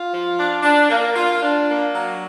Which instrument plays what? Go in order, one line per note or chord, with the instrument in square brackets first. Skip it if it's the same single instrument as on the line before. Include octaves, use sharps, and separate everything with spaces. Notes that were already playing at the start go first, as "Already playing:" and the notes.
Already playing: [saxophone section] F4
F3
D4
D4
A#3
F4
D4
A#3
F#3